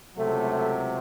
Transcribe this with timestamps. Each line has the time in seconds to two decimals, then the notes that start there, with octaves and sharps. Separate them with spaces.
0.16 C#2 C3 F#3 A3